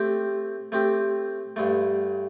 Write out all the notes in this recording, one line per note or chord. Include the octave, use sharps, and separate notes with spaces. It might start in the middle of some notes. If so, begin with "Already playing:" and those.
Already playing: A3 C4 G4
A3 C4 G4
G2 D3 A3